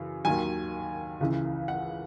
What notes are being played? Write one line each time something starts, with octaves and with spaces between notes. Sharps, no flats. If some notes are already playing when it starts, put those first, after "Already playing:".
Already playing: F#2 C#3 E3
D#2 D#3 F#3 G#5
C#2 C#3 E3
F#5